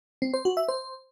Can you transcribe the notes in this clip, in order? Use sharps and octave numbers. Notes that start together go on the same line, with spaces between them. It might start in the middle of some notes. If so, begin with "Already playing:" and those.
C4
C5
F#4
E5
C5